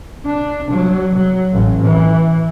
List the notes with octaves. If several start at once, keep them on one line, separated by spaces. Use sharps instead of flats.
D4
F#3
F#3
A1
E3